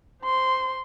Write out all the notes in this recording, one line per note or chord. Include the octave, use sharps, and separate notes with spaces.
C5 C6